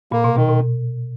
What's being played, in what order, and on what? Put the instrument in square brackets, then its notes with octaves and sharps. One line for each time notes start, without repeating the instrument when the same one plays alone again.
[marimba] A#2 [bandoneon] A#3
[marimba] B2
[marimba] B2 [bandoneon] D#3
[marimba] B2